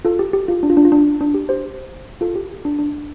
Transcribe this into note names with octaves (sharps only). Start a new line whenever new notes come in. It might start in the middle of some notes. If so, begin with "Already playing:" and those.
F4 A4
G4
G4
F4
D4
F4
D4
F4
D4
D4
G4
G4 C5
F4 A4
G4
D4
D4